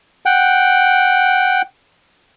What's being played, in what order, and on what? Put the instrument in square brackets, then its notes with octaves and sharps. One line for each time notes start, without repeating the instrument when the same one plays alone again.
[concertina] F#5 G5